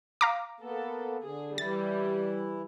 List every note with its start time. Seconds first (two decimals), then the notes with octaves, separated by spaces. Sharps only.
0.21 F5 A#5 D6
0.60 A#3 B3 A4
1.22 D3 G#4
1.58 E3 G3 E4 A6